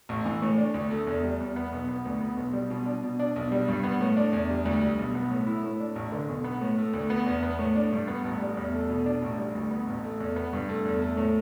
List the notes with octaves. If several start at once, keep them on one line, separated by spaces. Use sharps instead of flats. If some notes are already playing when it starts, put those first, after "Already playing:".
A1
E3
A2
D4
D2
A3
E2
G3
E2
B3
B1
B3
D2
B3
B1
G3
B2
D4
B2
D4
B1
G3
G2
B3
A2
D4
E2
G3
D2
G3
B1
B3
A2
E4
A2
D4
A1
D3
B1
B3
A2
A3
D2
B3
E2
B3
A2
D4
G2
B3
A1
G3
E2
A3
B2
D4
A1
G3
D2
B3
A1
A3
E2
B3
G2
A3
E2
A3
A2